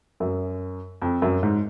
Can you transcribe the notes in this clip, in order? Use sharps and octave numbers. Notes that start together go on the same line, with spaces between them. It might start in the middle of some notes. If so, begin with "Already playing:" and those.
F#2
F2
F#2
G#2